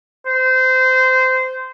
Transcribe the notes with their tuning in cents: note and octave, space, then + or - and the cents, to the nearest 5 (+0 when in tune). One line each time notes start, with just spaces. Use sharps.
C5 -20